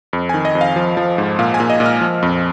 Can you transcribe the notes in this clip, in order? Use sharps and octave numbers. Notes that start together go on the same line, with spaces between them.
F2
D#3 G#5
D#5
F2
F5
F3
F3
G#2
A#2 F5
G#5
A#2
D#5
A#2
F6
F3
F2